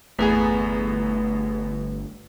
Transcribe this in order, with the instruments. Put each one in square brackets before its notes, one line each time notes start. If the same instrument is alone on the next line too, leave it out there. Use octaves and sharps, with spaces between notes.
[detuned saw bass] G1 [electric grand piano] E2 B3 G#4 [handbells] A3 B4